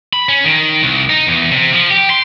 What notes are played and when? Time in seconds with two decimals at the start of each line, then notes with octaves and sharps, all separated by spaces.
0.13 B5
0.29 C#4
0.44 D#3
0.83 C2
1.10 D#4
1.27 E2
1.51 C3
1.73 F3
1.90 G4
2.10 C6